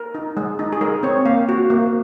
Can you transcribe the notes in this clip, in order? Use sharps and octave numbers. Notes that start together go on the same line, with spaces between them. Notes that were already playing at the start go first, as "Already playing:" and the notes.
Already playing: A#4
D#4
G#3
D#4
G#4
G#3 A#4
C4 C#5
A#3 F5
F#4
A#3